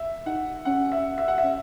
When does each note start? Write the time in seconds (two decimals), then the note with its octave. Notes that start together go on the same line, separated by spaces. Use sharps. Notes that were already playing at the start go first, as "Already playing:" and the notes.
Already playing: E5
0.26 D#4 F#5
0.65 C#4 F#5
0.92 E5
1.18 E5
1.28 F#5
1.38 E5
1.44 C#4